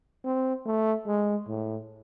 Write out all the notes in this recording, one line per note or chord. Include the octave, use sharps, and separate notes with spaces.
C4
A3
G#3
A2